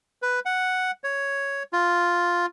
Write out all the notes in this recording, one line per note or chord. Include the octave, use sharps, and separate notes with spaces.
B4
F#5
C#5
F4